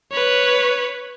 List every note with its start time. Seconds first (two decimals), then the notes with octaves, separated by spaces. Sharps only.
0.12 B4 C#5